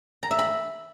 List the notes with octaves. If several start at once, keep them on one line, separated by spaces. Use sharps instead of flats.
A#5
E5
B5